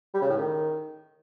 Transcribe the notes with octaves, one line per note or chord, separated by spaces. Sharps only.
G3
C#3
A2
D#3